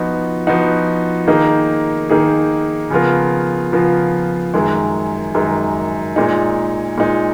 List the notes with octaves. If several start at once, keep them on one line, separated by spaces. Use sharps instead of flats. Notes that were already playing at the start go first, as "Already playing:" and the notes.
Already playing: F3 B3 D#4 F#4
F3 B3 D#4 F#4
D#3 A#3 D#4 G#4
D#3 A#3 D#4 G#4
C#3 F3 B3 F4 A#4
C#3 F3 B3 F4 A#4
F#2 D#3 G#3
F#2 D#3 G#3
A#2 G#3 D#4
A#2 G#3 D#4